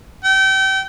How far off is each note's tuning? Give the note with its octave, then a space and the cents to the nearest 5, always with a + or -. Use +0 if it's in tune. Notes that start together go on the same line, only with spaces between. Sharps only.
G5 -30